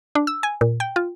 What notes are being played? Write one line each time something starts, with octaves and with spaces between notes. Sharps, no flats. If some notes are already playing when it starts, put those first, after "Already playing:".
D4
E6
G#5
A#2
G5
F4